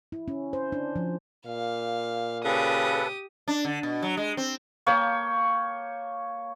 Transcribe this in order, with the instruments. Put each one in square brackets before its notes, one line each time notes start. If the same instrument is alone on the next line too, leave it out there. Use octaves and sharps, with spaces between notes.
[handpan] E4
C#4
C5
D4
F3
[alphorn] A#2 [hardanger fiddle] F5
[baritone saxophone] C#3 [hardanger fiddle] G4 D#6 [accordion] A4 B4
[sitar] D4
D3
B2
F#3
G#3
C4
[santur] A#3 C#5 G5 A5